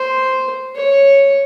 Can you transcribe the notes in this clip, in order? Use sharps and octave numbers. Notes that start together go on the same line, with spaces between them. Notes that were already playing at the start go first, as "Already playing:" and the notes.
Already playing: C5
C#5